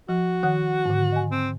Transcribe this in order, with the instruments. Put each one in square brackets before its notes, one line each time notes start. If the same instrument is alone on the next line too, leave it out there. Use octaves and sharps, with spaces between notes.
[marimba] F3 [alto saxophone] F#4
[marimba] D#3 F#5 F#6
G#2 D3
D#5 G#5
[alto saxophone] C4